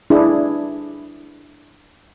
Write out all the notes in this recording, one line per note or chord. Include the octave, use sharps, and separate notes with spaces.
D4 E4 G#4